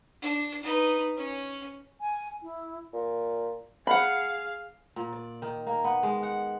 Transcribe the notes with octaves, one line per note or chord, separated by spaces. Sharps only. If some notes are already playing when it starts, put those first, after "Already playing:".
D4
D#4 B4
C#4
G#5
E4
A#2
G#4 F5 F#5 B5
A#2
D5
D#3
A#3
B3
G#3
F#5